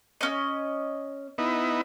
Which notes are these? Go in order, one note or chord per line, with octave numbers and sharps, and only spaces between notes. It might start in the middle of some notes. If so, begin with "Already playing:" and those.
C#4 D#5
B3 D#4 E4